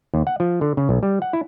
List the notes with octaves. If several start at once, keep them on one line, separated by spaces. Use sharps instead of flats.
D#2
F#5
F3
D3
C#3
B1
G3
F#5
E4